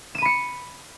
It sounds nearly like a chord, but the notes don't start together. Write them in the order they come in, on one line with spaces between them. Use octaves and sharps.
E7 D#7 B5 C#7